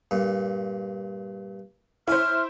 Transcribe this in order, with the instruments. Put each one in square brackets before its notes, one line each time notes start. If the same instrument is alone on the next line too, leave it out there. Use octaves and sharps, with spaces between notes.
[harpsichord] G2 A#2
[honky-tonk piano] E4 C5 [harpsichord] C#5 G#5 B5 [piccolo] F6